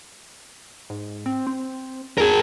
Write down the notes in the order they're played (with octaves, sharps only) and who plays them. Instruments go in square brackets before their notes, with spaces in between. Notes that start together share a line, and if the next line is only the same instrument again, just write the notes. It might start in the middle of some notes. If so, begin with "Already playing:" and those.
[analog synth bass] G#2
C4
C4
[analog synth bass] E2 [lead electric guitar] G#4 A#4